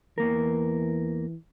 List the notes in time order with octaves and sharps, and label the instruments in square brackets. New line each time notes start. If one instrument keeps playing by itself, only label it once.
[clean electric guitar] E2 A#3 A#4 [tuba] E3